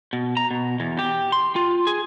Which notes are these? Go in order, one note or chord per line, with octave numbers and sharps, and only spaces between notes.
B2
A#5
B2
E2
G4
C6
F4
G#4